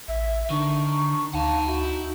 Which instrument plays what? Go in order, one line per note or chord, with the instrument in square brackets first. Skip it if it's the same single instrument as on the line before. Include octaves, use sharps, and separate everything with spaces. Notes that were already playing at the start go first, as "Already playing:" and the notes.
[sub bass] A1 [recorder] E5
[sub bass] D3 [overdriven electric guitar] D#3 [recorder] D4 [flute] C#6
[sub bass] D2 [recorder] D#4 [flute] F5 [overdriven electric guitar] F#5 A5
[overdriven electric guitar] E4 [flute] F#4